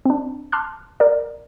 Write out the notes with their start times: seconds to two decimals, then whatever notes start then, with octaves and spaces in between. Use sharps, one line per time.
0.05 C4 D4
0.52 A5 C6 D6 F6 F#6
1.00 A#4 D5